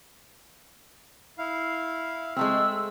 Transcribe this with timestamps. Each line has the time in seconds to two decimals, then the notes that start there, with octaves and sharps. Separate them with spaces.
1.38 E4 F5
2.36 G#3 A3 C4 E6